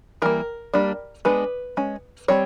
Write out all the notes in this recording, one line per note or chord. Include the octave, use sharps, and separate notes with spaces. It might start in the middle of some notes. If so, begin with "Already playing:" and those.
E3 G3 A#3 A#4
G3 A#3 D4
G#3 B3 D4 B4
G#3 C#4
G3 C4 C#5